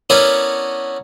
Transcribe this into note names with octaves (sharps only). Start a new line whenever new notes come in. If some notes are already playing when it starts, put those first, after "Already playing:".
B3 C#4 D4 E4 A#4